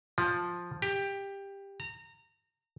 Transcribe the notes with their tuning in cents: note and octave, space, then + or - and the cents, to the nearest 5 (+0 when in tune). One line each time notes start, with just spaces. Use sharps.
F3 +5
G4 +15
A#5 -25